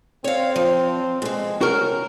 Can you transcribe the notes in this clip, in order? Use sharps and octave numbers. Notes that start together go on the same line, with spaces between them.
C4 C#5 F5
F3
B2 G#3 C4
C#4 F#4 A#4